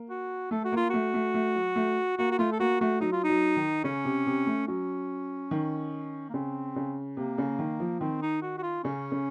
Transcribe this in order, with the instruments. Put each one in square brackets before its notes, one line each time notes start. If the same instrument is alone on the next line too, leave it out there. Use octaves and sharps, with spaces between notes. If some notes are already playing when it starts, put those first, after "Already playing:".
Already playing: [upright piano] A#3
[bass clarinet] F#4
[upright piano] A3 [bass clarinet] A4
[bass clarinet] F#4
[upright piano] A#3 [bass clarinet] F4
[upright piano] A3 [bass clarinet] F#4
[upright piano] A3
A3
F#3
A3
[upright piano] A#3 [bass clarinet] F#4
[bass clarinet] F#4
[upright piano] A3 [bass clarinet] F4
[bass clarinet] A4
[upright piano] A#3 [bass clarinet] F#4
[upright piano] A3 [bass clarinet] F#4
[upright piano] F#3 [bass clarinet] D#4
[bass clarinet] F4
D#4
[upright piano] F#3
D#3
[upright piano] C#3 [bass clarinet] C#4
[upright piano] C3
C3
A3
[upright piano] F#3 [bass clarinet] C#4
[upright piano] D#3
[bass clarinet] A#3
[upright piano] C#3 [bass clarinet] C4
[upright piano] C#3
[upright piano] C3 [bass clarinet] A#3
[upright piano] C#3
D#3
F3
[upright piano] D#3 [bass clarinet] C4
[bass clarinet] D#4
F#4
F#4
F4
[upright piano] C#3 [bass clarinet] C#4
[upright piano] C#3